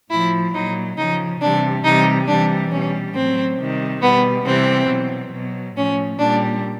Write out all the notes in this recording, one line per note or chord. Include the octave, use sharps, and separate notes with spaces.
A2 F3 E4
A#2 F#3 D#4
C#3 F3 D#4
C3 E3 G3 D4
C3 E3 G3 D#4
C3 E3 G3 D4
B2 G3 C#4
A2 F#3 C4
C3 D#3 G3
B2 G3 B3
C3 E3 G3 C4
B2 F#3
B2 F#3
A2 F3 C#4
A#2 G3 D4